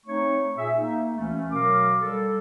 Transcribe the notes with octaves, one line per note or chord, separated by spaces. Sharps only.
A3 C4 D#4 C#5 C#6
A#2 G#4 E5
A#3 D#4
D2 E3 A3 C#4
B2 F#3 A#4 F5 D6
G3 A4